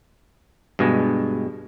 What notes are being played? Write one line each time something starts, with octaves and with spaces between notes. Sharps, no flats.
G2 B2 G#3